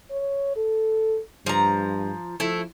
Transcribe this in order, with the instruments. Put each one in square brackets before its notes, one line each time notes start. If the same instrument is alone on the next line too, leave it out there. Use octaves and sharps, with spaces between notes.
[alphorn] C#5
A4
[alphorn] G2 [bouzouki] F3 A#5
[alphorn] F3 [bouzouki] A3 E4